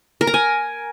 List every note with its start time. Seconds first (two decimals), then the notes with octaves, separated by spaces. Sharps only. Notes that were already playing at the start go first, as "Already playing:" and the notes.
0.21 A#4
0.27 A#5
0.34 G#5